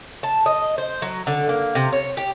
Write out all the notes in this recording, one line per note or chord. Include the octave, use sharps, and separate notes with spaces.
A5
D#5
C5
F#3
D3
A#3
C3
C#5
G4